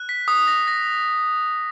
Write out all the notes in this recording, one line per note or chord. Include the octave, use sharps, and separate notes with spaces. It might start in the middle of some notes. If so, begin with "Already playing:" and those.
Already playing: F#6
B6
D#6
A#6
A#6